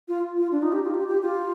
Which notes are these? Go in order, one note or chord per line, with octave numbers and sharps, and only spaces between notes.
F4
F4
D4
D#4
G4
F4
G4
G4
F4